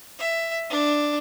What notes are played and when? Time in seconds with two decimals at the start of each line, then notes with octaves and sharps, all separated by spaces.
0.19 E5
0.70 D4